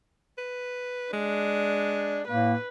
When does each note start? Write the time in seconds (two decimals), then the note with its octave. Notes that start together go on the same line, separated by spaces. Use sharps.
0.38 B4
1.13 G#3 D4
2.28 A2 A#3 B4